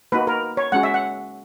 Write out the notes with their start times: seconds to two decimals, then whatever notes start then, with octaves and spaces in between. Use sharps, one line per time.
0.12 A#3 D#4 F#4 B4
0.27 A#4
0.57 C#5
0.72 G#3 C#4 F#4 F#5
0.83 E5
0.94 F#5